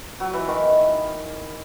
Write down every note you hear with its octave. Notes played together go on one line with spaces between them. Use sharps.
F#3
E3
D#3